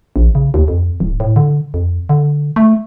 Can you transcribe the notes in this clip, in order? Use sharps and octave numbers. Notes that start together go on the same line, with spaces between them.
A#1
C#3
D#2
F2
D1
A2
D3
F2
D3
A3